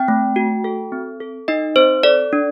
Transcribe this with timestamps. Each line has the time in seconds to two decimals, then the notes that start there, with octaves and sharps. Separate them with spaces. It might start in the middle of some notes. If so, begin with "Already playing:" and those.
Already playing: C4 G5
0.08 A3
0.36 F#4
0.64 A4
0.92 C4
1.20 A4
1.48 D#4 D#5
1.76 C4 C5
2.03 A4 D5
2.33 D4